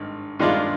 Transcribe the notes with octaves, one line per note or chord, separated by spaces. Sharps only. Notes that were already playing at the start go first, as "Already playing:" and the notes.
Already playing: G#1 G2 D#3
G2 D#3 G#3 D4 F4